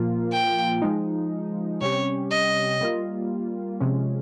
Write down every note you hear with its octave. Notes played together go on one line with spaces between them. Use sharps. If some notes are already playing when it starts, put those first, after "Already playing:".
Already playing: A#2 F3 A#3 F4
G5
F3 G#3 D#4
C3 G3 C#4 G4 C#5
D#5
G3 A#3 F4
C3 F3 G#3 C#4